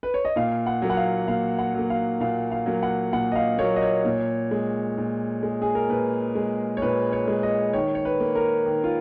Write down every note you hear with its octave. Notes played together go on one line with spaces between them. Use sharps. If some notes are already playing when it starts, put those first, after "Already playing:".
B4
C#5
D#5
A#2 F5
F#5
F#3 A#3
F#5
F5
A#2 F5
F#5
F#3 A#3
F5
A#2 F5
F5
F#3 A#3
F#5
A#2 F#5
D#5
F5
F#3 A#3 C#5
D#5
C#5
A#2
G#3
A#2
G#3
G#4
A#4
A#2 B4
G#3
C#5
A#2 B4
C#5
G#3
D#5
D#3 C#5
C#5
B4
A#3
A#4
D#3
F4